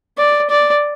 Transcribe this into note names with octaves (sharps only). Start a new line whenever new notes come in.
D5
D5